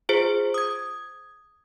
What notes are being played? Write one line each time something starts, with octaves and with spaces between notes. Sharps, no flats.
F4 G#4 C5
D#6 G#6